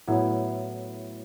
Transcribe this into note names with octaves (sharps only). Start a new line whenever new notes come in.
A2 F#3 B3 E4